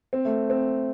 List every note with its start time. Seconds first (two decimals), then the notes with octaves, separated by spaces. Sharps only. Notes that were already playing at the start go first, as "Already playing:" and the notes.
0.13 C4
0.25 A3
0.50 C4